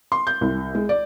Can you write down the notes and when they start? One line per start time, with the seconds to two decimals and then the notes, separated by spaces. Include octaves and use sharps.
0.12 C6
0.27 G6
0.41 C2
0.75 G#3
0.89 D5